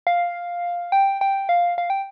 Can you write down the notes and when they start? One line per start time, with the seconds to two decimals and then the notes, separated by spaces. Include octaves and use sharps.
0.07 F5
0.92 G5
1.21 G5
1.49 F5
1.78 F5
1.90 G5